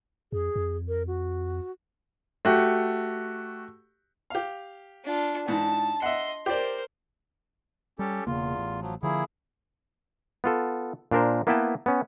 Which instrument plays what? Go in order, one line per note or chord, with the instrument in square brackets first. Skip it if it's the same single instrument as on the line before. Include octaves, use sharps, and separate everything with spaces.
[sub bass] F2 [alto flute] G#4
[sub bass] F2
[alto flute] A#4
F#4
[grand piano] A3 F#4 G4
[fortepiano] G4 F5
[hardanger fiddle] D4 F4
[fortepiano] G#2 E3 [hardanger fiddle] A5
[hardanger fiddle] D#5 C6 [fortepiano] E5 F#5
[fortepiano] G4 D5 [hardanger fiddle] A#4 C5
[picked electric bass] G3 [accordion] C#4 G4 A4
[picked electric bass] E1 C#3 A#3 [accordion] E2 F4
[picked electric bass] A1
[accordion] F3 F#3
[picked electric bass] D3 F3 [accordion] A#3 E4 G#4
[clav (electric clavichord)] B3 F4 A4
A#2 D4 A#4 C5
A#3 B3 E4 B4 G5 A5
B3 C#4